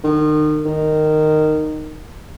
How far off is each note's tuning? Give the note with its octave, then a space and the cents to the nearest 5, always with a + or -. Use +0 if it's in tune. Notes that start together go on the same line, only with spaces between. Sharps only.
D#3 -35
D#3 -15